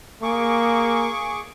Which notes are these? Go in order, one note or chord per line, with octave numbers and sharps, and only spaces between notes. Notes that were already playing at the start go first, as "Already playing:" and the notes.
A#3 G#4 C#6 D6